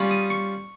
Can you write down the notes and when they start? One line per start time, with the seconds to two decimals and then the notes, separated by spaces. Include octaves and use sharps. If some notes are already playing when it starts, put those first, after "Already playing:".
Already playing: G3 C#4 F4
0.10 D#6
0.30 C#6